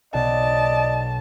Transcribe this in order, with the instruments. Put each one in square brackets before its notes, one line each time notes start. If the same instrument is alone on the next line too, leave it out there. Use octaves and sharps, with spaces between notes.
[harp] B1 [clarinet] D5 [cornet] D#5 [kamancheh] A5